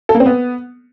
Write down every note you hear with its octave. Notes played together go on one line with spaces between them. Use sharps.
A4
A#3
C4
B3